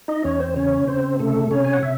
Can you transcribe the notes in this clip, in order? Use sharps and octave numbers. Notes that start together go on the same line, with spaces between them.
D#4 D#5
E2 C#4 C#5
C4 C5
C#3 C#4 C#5
C#3 C4 C5
C3 A3 A4
C3 C#4 C#5
G#5
F#5
C3 E5